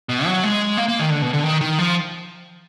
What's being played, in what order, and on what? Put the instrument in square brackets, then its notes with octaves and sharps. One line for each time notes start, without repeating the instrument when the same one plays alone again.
[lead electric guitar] B2
F#3
G#3
A#3
A#3
D#3
D3
B2
D3
D#3
D#3
F3